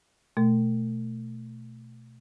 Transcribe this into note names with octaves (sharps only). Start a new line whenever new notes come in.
B2 A3